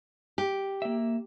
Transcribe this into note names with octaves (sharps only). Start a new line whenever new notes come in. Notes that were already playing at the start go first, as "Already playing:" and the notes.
G4
A#3 E5